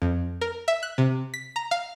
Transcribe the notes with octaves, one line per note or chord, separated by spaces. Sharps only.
F2
A#4
E5
F#6
C3
B6
A#5
F5